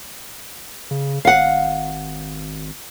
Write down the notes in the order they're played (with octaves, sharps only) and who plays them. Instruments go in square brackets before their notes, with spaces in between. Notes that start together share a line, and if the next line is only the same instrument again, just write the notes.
[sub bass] C#3
[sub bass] G#1 [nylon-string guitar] F5 F#5